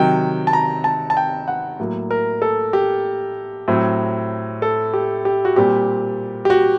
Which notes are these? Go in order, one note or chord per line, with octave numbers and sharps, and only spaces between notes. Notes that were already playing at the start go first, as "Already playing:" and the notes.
Already playing: C3 D#3 F#3 G5
A5
A#5
A5
A5
G5
F#5
A2 F#3 A#3
A#4
A4
G4
A2 F#3 C4
A4
G4
G4
F#4
A#2 G3 C4 G4
G4
F#4